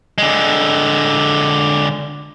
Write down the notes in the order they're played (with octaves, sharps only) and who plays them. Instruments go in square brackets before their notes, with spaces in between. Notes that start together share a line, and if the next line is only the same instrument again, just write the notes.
[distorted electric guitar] D3 G#3